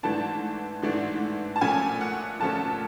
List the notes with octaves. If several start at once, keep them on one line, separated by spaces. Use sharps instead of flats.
G#2 E3 A3 D4 A5
G#2 E3 A3 D4
A5
A#2 F3 A3 C#4 G#5
F#5
A#2 F3 A3 C#4 A5